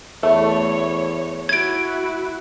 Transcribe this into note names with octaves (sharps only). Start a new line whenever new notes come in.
E2 A3 C#5
E4 F#4 G#6 D7